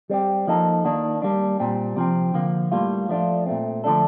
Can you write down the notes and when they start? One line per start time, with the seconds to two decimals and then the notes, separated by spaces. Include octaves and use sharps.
0.10 G3 C4 G4
0.47 F3 A#3 D#4 A4
0.85 D#3 A#3 D4
1.22 G3 A#3 D4
1.60 A#2 G3 C4
1.96 C3 F3 C4
2.34 D3 F3 A#3
2.72 A2 G3 A#3 F4
3.09 F3 A3 D4 F4
3.46 A#2 A3 C4
3.84 D3 F3 A3 D4 A4